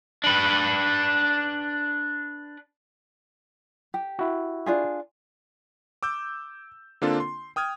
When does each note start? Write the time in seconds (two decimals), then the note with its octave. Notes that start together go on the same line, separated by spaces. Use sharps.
0.24 D4 B4
3.94 G4
4.19 E4 F#4
4.66 D4 F4 G#4
6.03 D6 E6 G6
7.02 D3 A#3 C4 D4 F4 A4
7.20 C6
7.56 G5 D#6 F6 G#6